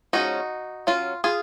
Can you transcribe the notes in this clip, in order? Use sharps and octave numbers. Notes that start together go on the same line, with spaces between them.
F3 G#3 C#4 D#4 F#4
F#3 C#4 F4
F4 G#4